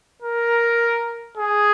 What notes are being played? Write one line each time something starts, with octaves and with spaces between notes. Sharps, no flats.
A#4
G#4